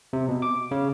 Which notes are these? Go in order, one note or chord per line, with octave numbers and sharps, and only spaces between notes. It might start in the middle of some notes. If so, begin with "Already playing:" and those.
C3
B2
D6
C#3